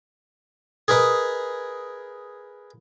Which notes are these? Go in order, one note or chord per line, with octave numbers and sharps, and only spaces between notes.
G#4 A#4 B4 D#5